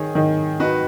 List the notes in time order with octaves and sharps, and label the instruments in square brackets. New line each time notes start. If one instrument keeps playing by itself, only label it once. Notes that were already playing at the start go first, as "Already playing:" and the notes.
Already playing: [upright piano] D#3 [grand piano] G#4 C#5
[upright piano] D#3
[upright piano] D#4 [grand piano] F#4 B4